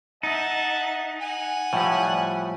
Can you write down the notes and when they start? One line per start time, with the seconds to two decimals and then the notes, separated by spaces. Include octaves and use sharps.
0.23 D#4 E5 F#5 A5
1.21 F#5 G#5
1.73 A2 F3 G3